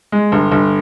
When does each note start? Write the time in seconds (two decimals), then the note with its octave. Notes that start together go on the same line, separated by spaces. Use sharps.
0.12 G#3
0.32 G1
0.52 G1